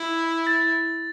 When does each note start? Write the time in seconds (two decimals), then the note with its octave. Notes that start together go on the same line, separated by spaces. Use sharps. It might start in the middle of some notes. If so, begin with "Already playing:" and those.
Already playing: E4
0.47 A6